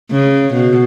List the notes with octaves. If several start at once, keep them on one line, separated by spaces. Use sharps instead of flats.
C#3
B2